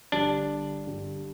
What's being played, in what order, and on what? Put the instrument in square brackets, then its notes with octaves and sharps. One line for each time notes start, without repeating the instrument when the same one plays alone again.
[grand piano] G1 G2 G3 [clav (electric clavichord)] D4
[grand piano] G1 G2 G3